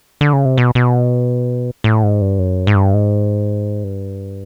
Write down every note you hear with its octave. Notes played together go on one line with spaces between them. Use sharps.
D3
C#3
C3
B2
B2
A2
G#2
G2
F#2
G#2
G2
G#2
G2